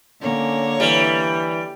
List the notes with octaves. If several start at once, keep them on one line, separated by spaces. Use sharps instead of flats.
D3 A#3 C#4 C#5
E3 G3